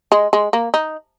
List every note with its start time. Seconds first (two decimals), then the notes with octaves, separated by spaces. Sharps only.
0.12 G#3
0.33 G#3
0.53 A#3
0.74 D#4